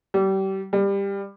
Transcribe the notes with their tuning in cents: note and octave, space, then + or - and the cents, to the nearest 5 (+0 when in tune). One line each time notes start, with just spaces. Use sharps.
G3 -30
G3 +20